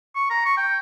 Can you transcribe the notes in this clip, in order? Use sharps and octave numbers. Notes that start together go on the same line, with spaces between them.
C#6
A#5
C#6
G5